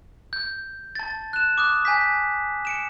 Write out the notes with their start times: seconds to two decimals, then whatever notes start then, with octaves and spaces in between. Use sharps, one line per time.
0.33 G6
0.95 A5 A6
1.33 F#6 E7
1.58 D6 D#6 F#6
1.85 G#5 G6 B6
2.65 C#7 D7 E7